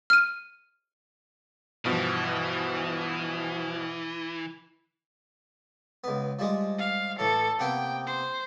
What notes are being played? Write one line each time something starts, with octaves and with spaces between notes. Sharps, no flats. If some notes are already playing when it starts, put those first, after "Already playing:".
F6 D#7
G2 B2 E3 F3
C#2 B3
F3 G3 G#3
F5
A2 E3 A4
C3 A#3 B3 G5
C5